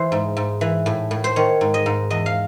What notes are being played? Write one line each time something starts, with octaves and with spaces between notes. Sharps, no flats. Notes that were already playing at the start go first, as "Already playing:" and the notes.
Already playing: E3 C5
G#2
G#2
E3
A2
A2
C5
D#3 C#5
G#2
D#5
G#2
E2 D#5
F5